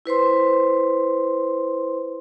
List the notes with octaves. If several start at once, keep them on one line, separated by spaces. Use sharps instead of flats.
E4 B4 C5 C6